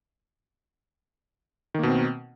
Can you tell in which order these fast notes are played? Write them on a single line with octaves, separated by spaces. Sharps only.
D#3 A#3 B2 C4